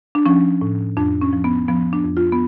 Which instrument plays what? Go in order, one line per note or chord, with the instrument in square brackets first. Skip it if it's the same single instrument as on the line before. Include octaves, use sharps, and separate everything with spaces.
[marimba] D4
F3 C#4
A2
F2 D4
C#4
F3
B3
F3 B3
D4
F2
F4
B3